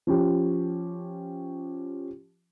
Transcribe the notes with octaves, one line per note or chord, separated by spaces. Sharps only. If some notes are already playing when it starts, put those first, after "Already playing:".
F3 C#4 G4